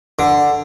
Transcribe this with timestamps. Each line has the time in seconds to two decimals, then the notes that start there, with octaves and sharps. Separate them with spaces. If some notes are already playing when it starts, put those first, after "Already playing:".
0.19 D3